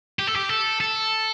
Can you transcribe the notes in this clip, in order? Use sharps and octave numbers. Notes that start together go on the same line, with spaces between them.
G4
A4
G4
A4
A4